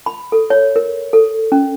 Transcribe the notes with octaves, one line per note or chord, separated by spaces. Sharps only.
B5
A4
C#5
A#4
A4
C#4